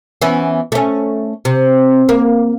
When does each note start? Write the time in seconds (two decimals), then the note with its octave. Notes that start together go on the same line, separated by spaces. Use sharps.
0.21 E3 B3 C#4
0.72 A3 C#4
1.45 C3
2.09 A#3